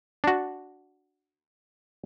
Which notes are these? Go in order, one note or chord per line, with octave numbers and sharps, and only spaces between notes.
D4 F#4